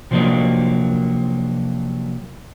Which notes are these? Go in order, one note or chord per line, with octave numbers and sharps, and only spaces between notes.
C3 F3 F#3 A#3 D4 D#5